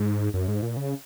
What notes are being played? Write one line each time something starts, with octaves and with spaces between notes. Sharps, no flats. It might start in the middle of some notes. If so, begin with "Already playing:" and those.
Already playing: G#2
F#2
G#2
A#2
C#3